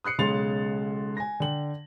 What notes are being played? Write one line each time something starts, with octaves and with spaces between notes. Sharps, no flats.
D#6 F#6 C7 C#7
B1 C#3 G#3 C6 A6 F7
G#5 A#6
D3 G5 F#7